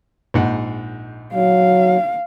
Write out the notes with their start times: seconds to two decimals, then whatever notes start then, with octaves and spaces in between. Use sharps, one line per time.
0.34 A#1 G#2 F#5
1.34 F#3 F5